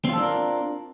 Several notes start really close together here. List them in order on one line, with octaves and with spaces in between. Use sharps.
C4 F4 A4 D4 A#4